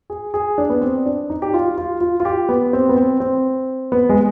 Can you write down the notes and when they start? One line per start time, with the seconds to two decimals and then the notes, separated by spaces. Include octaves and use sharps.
0.10 G#4
0.34 G#4
0.58 D4
0.70 B3
0.81 C4
1.06 D4
1.30 D#4
1.42 G4
1.54 F4
1.78 F4
2.01 F4
2.20 F4
2.25 G4
2.49 B3
2.73 C4
2.89 B3
2.96 C4
3.20 C4
3.92 B3
4.09 G#3